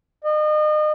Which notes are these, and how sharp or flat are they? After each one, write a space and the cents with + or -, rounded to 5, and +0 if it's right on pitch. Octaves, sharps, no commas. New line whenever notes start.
D#5 -35